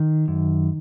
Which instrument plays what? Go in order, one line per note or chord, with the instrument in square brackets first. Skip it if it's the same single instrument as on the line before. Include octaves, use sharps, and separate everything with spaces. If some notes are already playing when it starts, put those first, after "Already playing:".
Already playing: [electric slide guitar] D#3
F#2